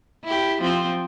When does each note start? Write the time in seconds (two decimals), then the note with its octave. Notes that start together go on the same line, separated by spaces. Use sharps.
0.24 E4 G4
0.61 F3 C4